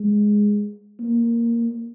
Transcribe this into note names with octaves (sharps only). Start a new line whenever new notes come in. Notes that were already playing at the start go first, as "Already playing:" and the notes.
Already playing: G#3
A#3